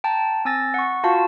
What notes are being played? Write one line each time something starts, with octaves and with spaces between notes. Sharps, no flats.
G5 A5 A#5
C4 G#5 E6 A6 A#6
F#5 C#6
F4 F#4 F5 A5